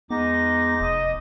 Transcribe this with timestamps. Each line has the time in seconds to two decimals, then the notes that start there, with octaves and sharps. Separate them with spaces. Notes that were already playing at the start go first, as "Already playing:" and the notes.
0.10 E2 G#3 B3 D#4 D6 A#6
0.81 F1 D#5